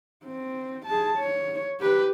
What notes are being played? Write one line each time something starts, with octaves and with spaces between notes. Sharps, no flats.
C4
G#4 A5
C#5
G4 B4